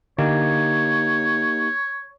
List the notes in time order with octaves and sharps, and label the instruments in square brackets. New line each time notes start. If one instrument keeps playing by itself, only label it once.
[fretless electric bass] D3 [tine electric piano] A#3 D#4 G4 [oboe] C#5